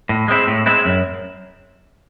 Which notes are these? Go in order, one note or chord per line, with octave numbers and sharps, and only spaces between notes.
A2
G#3 C4 E4
A2
G#3 C4 E4
F#2